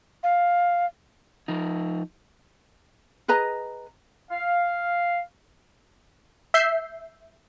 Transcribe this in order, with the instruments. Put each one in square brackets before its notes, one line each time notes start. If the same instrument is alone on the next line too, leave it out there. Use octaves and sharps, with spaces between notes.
[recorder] F5
[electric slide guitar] F3 D#4
[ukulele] G#4 B4 D#5 A#5
[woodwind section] F5
[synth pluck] E5 G6 C7